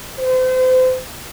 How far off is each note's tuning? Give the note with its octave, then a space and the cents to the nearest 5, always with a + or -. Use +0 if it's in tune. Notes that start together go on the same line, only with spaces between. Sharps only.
C5 -35